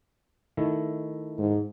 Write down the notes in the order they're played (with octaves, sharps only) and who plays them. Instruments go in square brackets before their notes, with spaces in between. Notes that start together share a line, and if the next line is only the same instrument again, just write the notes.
[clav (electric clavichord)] D#3 A3 E4
[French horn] G#2